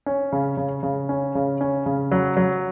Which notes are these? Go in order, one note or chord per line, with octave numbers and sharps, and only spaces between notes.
C#4
C#3
C#3
C#3
C#4
C#3
C#4
C#3
F#3
F#3